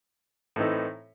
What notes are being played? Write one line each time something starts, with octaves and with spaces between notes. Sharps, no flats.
A2 E3 C4 D#4 A4